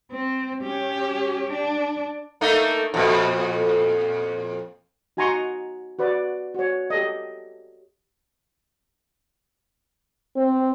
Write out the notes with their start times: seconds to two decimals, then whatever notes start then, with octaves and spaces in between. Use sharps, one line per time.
0.11 C4
0.63 C#4 G4
1.52 D4
2.41 A3 A#3 D#4
2.94 F2 A#2
5.17 D#4 F#4 G#5 A#5 C6 C#6
5.99 F#4 B4 D5
6.54 F#4 C#5
6.90 G4 A4 D#5
10.36 C4